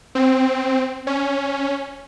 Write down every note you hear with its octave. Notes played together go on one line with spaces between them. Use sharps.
C4
C#4